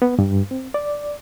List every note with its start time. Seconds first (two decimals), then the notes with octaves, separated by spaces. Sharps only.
0.02 B3
0.19 G2
0.51 C4
0.74 D5